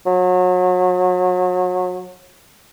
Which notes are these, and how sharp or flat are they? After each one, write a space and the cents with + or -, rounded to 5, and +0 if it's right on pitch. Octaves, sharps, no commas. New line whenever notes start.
F#3 -30